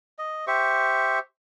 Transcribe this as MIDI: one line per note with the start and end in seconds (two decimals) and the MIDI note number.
0.19 0.45 75
0.47 1.19 67
0.47 1.19 72
0.47 1.19 76
0.47 1.19 85